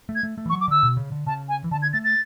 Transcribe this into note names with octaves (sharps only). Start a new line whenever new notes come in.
A3
G#6
A3
A3
E3
C#6
F#3
D6
D3 E6
B2
C#3
D3
C#3 A5
G#5
E3
D3 A5
G#6
A3 A6
A6